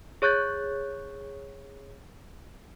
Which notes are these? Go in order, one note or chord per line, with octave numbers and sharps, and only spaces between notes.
G#4 C#5 C#6 F#6 G6 A6